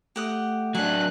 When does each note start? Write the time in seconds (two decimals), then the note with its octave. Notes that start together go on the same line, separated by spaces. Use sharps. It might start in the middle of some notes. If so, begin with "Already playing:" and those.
0.16 A3 G4 F#5 D#6
0.75 F#3 D4 G#5 F#6